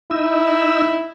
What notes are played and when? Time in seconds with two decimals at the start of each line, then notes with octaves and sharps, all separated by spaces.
0.11 D#4 E4 E6